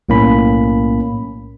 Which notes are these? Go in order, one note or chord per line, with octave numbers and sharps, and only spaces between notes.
B1 A2 A#3 C#4 B5